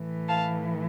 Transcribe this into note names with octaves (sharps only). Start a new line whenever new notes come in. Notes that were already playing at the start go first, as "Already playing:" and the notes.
Already playing: A2 E3
F5 A5